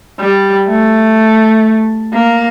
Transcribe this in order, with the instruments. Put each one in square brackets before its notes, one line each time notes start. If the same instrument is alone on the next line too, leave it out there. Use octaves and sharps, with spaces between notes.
[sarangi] G3
A3
A#3